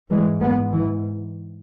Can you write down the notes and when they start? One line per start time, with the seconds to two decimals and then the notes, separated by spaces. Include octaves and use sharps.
0.10 G#2 E3 G#3
0.41 G#3 B3
0.72 E3